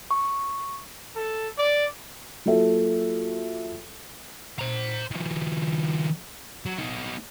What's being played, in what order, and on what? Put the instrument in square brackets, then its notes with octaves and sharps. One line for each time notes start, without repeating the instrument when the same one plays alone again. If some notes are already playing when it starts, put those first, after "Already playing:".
[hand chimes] C#6
[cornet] A4
D5
[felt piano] F#3 A#3 F4 A4 E5
[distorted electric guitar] C5 A#5
D#3 F3
F#3
B3 D#4